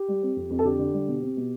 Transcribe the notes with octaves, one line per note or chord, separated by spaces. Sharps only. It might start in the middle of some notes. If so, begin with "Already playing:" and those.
Already playing: G4
G3
C4
F2
F2
A4
D3 G4
D3
G3
B2
C4
B2